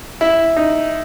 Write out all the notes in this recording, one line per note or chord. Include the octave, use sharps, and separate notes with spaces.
E4
D#4